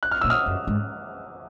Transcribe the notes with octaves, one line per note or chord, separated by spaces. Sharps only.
F#6
F6
A#2 E6
D#6 F6
F#2
G#2